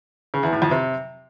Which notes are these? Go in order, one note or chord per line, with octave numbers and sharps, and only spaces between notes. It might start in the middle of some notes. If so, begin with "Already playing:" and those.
C#3
E2
A2
F2
C3